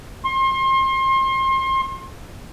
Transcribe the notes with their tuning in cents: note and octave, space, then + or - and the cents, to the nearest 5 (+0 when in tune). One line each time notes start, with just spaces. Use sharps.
C6 +35